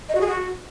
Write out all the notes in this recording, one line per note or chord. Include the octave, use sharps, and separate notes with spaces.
D#5
F#4
G#4
F#4